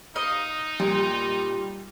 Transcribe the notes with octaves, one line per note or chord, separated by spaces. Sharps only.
D#4 D#5 F5
A#2 G3